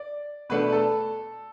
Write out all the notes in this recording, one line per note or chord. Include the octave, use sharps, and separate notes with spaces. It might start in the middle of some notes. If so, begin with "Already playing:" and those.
Already playing: D5
B2 A3 D4 B4
A4